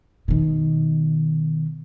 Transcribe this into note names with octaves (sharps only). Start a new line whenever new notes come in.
B2 D#3